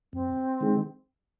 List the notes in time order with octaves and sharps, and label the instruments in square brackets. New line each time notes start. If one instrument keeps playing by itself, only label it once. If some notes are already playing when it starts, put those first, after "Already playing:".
[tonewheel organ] F2 [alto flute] C4
[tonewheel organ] D#3 G#3 D#4 G#4